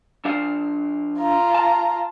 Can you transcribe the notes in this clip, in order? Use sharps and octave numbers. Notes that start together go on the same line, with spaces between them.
F3 D4 F5
F4 A#5
A5